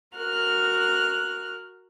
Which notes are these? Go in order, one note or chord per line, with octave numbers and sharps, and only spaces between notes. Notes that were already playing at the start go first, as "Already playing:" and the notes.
F#4 A#4 F6 F#6